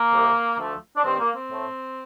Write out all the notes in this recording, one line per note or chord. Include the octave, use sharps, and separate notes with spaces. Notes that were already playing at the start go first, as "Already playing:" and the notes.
Already playing: A#3
C2 C3 D#3
D2 D3 F3 A3
D4
G2 D#3 G3 C4
A#3
C4
A2 A3